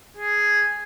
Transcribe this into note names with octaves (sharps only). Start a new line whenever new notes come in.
G#4